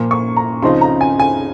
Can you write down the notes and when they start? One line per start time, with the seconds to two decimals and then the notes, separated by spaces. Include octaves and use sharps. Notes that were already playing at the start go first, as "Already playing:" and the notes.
Already playing: A#2 F3 A#3
0.11 C#6
0.37 A#5
0.62 C#2 C#3 F3 C4 D#4 C6
0.81 A#5
1.01 G#5
1.19 G#5